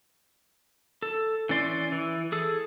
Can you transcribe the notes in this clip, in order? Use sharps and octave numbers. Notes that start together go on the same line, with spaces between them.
A4
E3 C#4 D5 C6
E3
G#4 A4